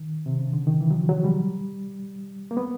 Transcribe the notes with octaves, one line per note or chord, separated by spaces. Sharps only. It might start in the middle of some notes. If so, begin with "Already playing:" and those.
Already playing: D#3
C3
C#3
D3
D#3
E3
F#3
F3
F#3
G3
A#3
B3